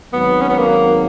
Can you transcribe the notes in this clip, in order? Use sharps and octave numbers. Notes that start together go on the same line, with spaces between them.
G#1 G#2 F#3 B3
C#4
B3
A#3